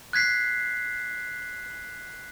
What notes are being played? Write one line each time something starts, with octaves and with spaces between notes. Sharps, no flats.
F#6 G#6 B6 C7